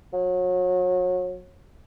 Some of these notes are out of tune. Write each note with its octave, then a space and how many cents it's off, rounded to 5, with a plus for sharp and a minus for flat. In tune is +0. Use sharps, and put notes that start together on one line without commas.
F#3 -30